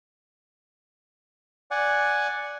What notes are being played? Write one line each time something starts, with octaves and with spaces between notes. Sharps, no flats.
D5 F#5 G#5